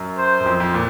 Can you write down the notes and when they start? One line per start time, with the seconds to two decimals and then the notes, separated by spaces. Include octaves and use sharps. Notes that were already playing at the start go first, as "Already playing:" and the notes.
Already playing: F#2
0.17 C5
0.40 F#2
0.46 F2
0.60 F2
0.74 A#2